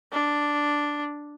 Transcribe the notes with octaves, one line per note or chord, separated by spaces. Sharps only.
D4